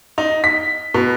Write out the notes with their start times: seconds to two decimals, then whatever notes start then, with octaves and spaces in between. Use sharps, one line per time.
0.18 D#4
0.44 B6
0.94 B2